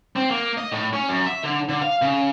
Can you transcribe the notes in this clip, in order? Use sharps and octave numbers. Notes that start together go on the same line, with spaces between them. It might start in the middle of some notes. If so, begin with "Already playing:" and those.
C4
A#3
D#5
A2
C#4
F#2
E5
D3
D3
F5
C#3